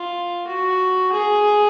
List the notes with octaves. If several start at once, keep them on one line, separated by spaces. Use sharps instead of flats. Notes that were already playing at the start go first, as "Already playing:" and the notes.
Already playing: F4
F#4
G#4